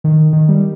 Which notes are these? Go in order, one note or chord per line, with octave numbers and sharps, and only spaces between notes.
D#3
D#3
G3